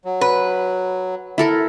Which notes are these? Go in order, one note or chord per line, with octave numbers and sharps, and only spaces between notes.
F#3
B4
E4 A4 A#4